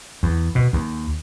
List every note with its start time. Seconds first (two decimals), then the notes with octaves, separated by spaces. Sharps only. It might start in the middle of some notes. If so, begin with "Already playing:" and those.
0.23 E2
0.55 B2
0.73 D#2